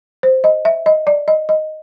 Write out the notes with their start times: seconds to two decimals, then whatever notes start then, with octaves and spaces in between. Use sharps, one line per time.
0.23 C5
0.44 D#5
0.65 E5
0.86 D#5
1.07 D5
1.28 D#5
1.49 D#5